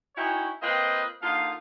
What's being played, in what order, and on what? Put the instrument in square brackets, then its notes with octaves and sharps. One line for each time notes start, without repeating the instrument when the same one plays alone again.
[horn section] C#4 D#4 E4 F#4 C#5 G5
A#3 C4 F4 B4 D#5 G5
D3 A#3 D#4 F4 F5